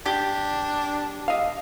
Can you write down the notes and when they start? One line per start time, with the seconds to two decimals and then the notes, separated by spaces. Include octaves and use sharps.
0.06 D4 G4
1.28 D#5 F5